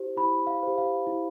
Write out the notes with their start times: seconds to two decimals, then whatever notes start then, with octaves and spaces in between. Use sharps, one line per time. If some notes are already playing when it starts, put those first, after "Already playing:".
Already playing: E4 G4 C5
0.17 E4 B5
0.47 F5
0.63 G4 C5
0.78 F5
1.07 E4